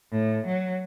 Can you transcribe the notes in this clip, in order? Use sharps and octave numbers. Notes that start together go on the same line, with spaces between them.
A2
F#3